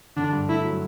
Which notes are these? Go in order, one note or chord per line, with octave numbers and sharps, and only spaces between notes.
D3 D4
G2
A3 E4
F#3